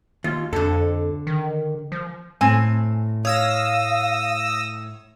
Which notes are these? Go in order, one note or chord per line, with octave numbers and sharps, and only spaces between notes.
D#2 F4
F2 D3 A4
D#3
F3
A2 C4 G#5
C#5 F5 D#6 E6 A#6